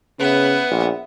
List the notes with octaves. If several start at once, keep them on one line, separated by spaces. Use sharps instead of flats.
C#3 B3 B4 E5
A#1